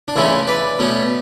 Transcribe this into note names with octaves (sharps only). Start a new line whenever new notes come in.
D4
C#2 C#3 E3 A3 C#4 E4
B4 D5
B2 A3 C#4